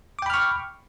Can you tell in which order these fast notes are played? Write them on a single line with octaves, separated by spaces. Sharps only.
D6 G5 B5 F6 C#6